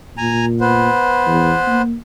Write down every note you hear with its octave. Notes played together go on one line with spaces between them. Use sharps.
A#2 G#5 A#5
B3 B4 C5
E2
A#3